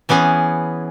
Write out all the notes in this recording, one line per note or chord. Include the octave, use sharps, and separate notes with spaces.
E3 B3 C#4 G#4